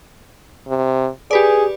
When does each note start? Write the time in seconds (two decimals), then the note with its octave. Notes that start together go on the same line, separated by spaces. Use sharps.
0.67 C3
1.31 G4 G#4 B4 D5